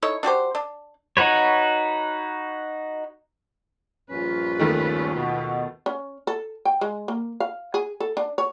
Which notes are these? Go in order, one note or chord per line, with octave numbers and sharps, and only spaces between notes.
D#4 E4 A4 C#5
D4 F#4 G4 C5
D4
D#4 F#4 B4 C#5
A#1 G2 C#4 F4 B4
D#2 D#3 A3
B2
C#4
A4
G5
G#3
A#3
F5
G#4
A4
D4
C#5